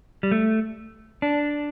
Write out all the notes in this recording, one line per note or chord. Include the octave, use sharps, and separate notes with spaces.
G3
A3
D4